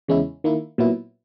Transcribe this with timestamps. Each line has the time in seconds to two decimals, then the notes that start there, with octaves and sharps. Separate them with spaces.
0.08 E2 C#3 G#3 C#4 E4
0.44 D#3 A#3 E4
0.78 A#2 F#3 B3 E4